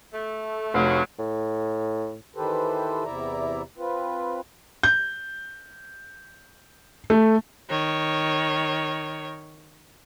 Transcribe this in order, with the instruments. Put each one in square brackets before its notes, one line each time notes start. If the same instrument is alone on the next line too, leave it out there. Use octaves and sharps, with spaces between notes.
[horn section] A3
[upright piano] F1 [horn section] G2 F#3
[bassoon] A2
[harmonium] D#3 E3 G4 A4 B4 C5
E2 C3 E4 D5 E5 A#5
C4 F4 B4
[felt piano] G6
A3
[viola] D#3 C#5